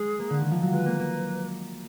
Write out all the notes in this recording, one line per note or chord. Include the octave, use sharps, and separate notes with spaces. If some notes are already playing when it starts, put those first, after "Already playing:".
Already playing: G#3 G#4
A#3
D3
D#3
F3
F#3
G#3 B4
A#3
A#3